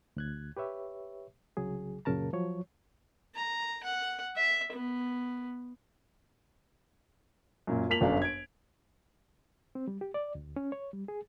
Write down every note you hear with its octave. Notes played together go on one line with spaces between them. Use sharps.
D2 F#6 G#6
G4 B4 C#5 E5
C2 C#3 F#3 G#4
F#2 A#2 C#3 A#4 A5 A#5
F3 F#3 C#5
A#5
F#5
E5
B3
F#2 A#2
A#3 F4 A5 B6 F7 F#7
G1 F#2 D4 A4 F5
G#6 D7
C4
G3
G4
D5
D2
C#4
C#5
G3
G#4